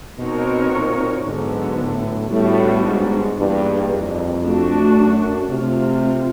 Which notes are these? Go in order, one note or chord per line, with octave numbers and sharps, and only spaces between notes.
B2 C4 D#4 F#4 A#4 C#5
A#2
G#2 D3 F#3 B3
A2
A2 G3 B3 D4 F#4
G#2
G2 E3 G3 A#3 D#4 G#4
F2
A3 D4 F#4
F#2
C3 A3 C4 F4